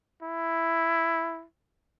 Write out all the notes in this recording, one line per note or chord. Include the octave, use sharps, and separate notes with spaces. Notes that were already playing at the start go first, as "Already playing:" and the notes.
E4